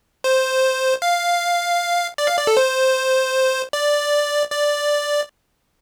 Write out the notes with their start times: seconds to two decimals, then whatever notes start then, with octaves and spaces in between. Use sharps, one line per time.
0.24 C5
1.02 F5
2.18 D5
2.28 F5
2.38 D5
2.47 A4
2.57 C5
3.73 D5
4.51 D5